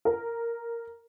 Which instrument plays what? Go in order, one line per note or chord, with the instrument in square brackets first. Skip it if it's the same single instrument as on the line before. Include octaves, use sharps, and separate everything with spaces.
[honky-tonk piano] A#4